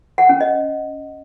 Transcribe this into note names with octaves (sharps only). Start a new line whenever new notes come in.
F#5
C#4
D#5